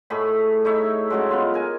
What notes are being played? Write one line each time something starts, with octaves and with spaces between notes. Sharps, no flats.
A2 A3 G#4 B5
D#4 E4 C#5 E5
C#3 F#3 G#3
B3 F4
A#4 G#5